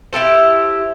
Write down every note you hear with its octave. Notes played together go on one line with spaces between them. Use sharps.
E4 G4 A4 C5